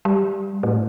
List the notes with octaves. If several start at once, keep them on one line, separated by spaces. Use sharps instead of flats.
G3
A2